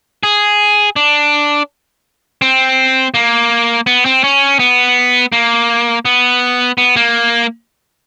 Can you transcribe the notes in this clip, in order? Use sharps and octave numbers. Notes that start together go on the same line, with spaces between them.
G#4
D4
C4
A#3
B3
C4
C#4
B3
A#3
B3
B3
A#3